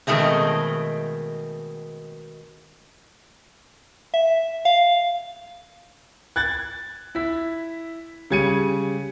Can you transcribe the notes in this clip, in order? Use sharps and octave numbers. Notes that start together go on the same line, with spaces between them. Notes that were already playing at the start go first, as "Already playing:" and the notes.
B2 D#3 G#3 A3 C4
E5
F5
F#6 G#6 A6
E4 B6
C#3 G3 G#6 C#7 D#7